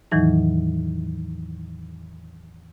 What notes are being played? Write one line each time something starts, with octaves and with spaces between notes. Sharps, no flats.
E2 A2 D#3 E3 F#3 D#4